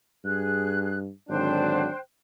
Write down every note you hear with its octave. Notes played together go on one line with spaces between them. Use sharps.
G2 G#4 F#6
G#1 D3 F#3 D4 C5 G5 F#6